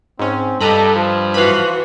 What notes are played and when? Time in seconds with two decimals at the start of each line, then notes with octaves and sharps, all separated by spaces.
0.19 G#2 C4 C#4
0.60 G2 G3 A4 D#5 A#5 B5
0.96 F3
1.34 E3 F#4 F5 B5